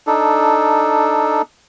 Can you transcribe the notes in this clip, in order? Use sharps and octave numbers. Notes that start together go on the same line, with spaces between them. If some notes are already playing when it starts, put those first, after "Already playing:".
D4 D#4 A4